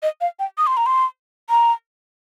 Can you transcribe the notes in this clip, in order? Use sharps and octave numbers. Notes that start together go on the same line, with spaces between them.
D#5
F5
G5
D#6
C6
A#5
C6
A#5